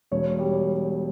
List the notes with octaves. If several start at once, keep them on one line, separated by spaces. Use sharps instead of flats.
E1 C#5
G3 C#5